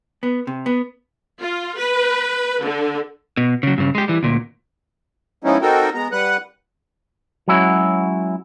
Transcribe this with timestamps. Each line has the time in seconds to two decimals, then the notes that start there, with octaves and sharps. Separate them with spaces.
0.23 B3
0.47 C3
0.66 B3
1.40 F4
1.79 B4
2.65 D3
3.37 B2
3.63 C#3 F#3
3.78 G2 C#3
3.95 G#3 G4
4.08 E3 G3
4.23 D2 A#2
5.44 F3 G#3 B3 C#4 D#4 E4
5.62 C4 D#4 F#4 A4 A#4 G5
5.94 G#3 B3 A#5
6.12 G3 B4 F#5 F#6
7.48 F#3 G#3 C#4 E4 F#4